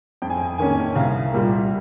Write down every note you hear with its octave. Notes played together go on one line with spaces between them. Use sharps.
F2 G5
G#5
G5
D#3 A#3 C#4 G#5
C2 F5
A#2 G3 A#3 F4